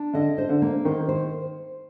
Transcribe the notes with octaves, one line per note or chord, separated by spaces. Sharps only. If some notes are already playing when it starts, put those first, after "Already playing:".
Already playing: D4
D3 D#5
C5
D3
A#3
D#3 C5
C5